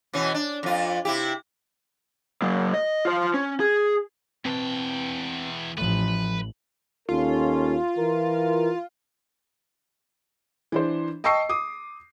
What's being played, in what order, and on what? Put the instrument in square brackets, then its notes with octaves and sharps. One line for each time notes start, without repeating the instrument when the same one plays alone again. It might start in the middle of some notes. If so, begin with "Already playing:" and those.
[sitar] B2 E3 C#4
D4
F2 F4
C3 E4 G4
[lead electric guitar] F#3 A#3
D#5
F4 C5
C#4
G#4
[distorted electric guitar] E2 G5 [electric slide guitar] C4 B4 A5
[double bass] A1 [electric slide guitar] F3 A3 [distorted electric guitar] B4
[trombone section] D#2 C#4 A4 [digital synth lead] F4
[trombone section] E3 A#4
[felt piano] E3 D4 C5
D#5 G5 A5 C#6 E6 C7
D6 D#6